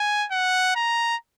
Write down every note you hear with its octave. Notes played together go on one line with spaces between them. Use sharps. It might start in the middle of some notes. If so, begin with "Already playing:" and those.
Already playing: G#5
F#5
A#5